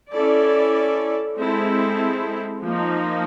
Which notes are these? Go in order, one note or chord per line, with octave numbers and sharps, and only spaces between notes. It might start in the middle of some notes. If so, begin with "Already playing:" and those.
C#4 E4 A4 D5
G#3 C4 E4 A4
F3 A#3 D#4